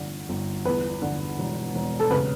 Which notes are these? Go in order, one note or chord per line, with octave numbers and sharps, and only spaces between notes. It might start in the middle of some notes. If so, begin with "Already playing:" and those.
Already playing: G1 D3
G1
E2 B4
D3
E1
E1
A4
C#3 B4